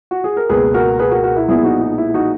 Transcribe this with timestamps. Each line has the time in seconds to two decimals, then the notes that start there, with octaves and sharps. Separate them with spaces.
0.11 F#4
0.24 G#4
0.37 A#4
0.49 C#2 B2 A#3 G#4 B4
0.74 F#4 A#4
0.99 G#4 B4
1.11 F#4 A#4
1.24 F#4 A#4
1.37 E4
1.48 B1 A#2 G#3 B3 E4 G#4
1.64 D#4 F#4
1.81 D#4
1.98 E4
2.14 D#4 F#4